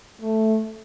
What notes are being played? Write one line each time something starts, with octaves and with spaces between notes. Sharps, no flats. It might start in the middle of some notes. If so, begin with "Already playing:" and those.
A3